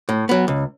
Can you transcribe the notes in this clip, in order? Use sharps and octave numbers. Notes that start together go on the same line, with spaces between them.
A2
F#3 B3
C#2